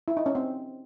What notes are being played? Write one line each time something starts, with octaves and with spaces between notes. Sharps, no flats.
E4
D#4
C#4
C4